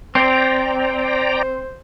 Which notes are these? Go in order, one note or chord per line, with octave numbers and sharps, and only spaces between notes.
C4 C5 D5 G5 A#5